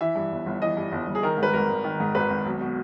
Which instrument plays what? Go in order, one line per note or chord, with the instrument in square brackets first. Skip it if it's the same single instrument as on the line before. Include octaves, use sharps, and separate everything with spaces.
[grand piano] E3 E5
G2
G1
G1
E3 D#5
G2
G1
G1
G#4
D#3 A#4
G#2 B4
G#1 A#4
G#1
D#3
G#2
G#1 B4
G#1
B1
B2